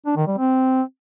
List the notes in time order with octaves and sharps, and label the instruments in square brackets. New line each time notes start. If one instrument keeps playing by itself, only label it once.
[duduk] D4
D#3
G3
C4